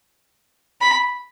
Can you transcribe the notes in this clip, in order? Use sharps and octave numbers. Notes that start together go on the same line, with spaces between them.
B5